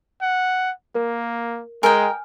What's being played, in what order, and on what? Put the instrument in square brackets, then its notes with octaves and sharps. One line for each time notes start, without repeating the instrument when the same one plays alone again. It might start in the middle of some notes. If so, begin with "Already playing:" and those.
[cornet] F#5
[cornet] A#3 [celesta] A#4
[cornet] G#3 [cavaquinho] A#4 D#5 G5 [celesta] G#5 F6